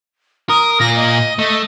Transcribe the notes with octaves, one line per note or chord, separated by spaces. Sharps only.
A#4 D#6
A#2 F4 A#6
D#5
A3 D#5